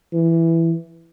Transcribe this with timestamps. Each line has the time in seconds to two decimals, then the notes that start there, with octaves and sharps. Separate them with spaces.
0.13 E3